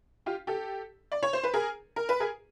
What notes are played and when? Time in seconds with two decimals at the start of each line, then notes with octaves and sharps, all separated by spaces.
0.26 F4 G4
0.47 G4 A4
1.12 D5
1.23 C#5
1.33 C5
1.43 B4
1.54 G#4 A#4
1.96 A#4
2.09 B4
2.20 G#4 A#4